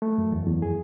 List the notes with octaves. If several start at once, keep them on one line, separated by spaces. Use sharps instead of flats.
A3
F#2
E2
E2
G#4